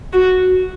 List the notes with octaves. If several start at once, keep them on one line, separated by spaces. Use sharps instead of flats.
F#4